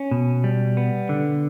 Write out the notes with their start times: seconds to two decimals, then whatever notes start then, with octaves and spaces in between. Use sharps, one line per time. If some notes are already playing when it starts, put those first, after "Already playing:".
Already playing: C#4
0.11 B2
0.44 G3
0.77 B3
1.09 D3